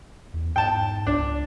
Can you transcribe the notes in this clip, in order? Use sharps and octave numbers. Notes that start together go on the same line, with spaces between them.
E2
G#2 G5 A5
C#2 D4
C#2